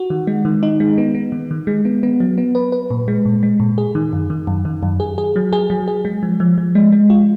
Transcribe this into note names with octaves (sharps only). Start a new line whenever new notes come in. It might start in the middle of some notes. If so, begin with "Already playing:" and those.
Already playing: F#4
D#3
G#3
D#3
D#4
G#3
B3
B3
D#3
D#3
G#3
B3
B3
F#3
B3
B4
B4
A#2
G#3
A#2
G#3
A#2
G#4
D#3
F#2
D#3
F#2
D#3
F#2
G#4
G#4
F#3
G#4
F#3
G#4
G#3
F3
F3
F3
G#3
G#3
F4